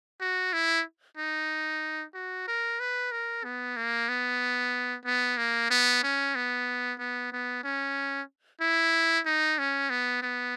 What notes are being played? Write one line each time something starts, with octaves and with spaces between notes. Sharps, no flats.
F#4
E4
D#4
F#4
A#4
B4
A#4
B3
A#3
B3
B3
A#3
B3
C#4
B3
B3
B3
C#4
E4
D#4
C#4
B3
B3